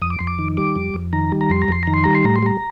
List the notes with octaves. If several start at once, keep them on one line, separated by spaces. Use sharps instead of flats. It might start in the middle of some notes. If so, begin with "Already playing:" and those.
F2 D#6
D6
F2 C6
D6
D#3
G3 D6
F2
F2
D#3 A#5
G3
A#5
F2 C6
A#5
F2 C6
D#3 A#5
C6
G3 A#5
C6
A2 A#5
C6
G3 A#5